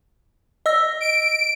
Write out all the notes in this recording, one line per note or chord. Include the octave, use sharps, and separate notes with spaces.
D#5 E6 A#6
D7